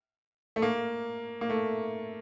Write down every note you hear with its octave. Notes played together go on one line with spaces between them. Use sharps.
A3
A#3
A#3
A3